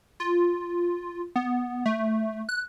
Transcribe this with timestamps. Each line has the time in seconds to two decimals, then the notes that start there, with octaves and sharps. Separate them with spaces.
0.20 F4
1.36 B3
1.86 A3
2.49 F#6